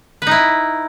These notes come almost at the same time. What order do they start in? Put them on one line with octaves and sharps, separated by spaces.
B4 D#4 E4